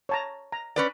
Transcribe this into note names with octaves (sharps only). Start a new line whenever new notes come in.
C#5 A5 A#5
A#5
C#4 B4 D5